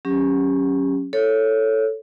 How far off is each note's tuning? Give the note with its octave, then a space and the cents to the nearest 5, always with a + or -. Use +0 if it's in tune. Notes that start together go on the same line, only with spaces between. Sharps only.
F#3 +0 C#4 -10 G4 +25
A4 +5 C#5 +0